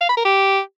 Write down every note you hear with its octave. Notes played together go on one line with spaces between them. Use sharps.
F5
B5
A#4
G4